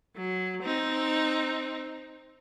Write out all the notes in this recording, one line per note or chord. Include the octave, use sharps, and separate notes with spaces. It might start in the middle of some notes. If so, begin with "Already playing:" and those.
F#3
C4 D#4